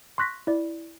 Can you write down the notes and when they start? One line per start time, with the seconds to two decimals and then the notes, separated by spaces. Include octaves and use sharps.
0.18 C6 C#6 F#6 A#6 B6
0.47 E4 D5